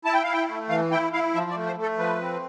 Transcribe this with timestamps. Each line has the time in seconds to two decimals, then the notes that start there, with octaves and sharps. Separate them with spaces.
0.05 E4 A5
0.14 G5
0.24 E4 F5
0.33 G5
0.48 A3
0.69 E3 F5
0.91 E4 G5
1.13 E4 F5
1.34 F3 E5
1.50 D5
1.55 A3
1.67 C5
1.77 A3
1.82 A4
1.98 F3 B4
2.21 C4